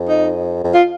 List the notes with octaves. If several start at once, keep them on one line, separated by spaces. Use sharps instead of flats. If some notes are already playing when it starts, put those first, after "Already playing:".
Already playing: F2
D#4
F2
F4